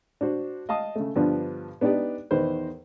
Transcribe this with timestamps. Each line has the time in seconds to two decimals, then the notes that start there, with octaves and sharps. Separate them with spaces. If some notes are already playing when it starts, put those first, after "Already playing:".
0.21 D4 F#4 C5
0.69 D#5 F5 A5 D#6
0.96 C#3 A3
1.16 G2 D3 F3 B3 D4
1.81 B3 D4 D#4 G4 D5
2.31 E2 D#3 D#4 B4 C5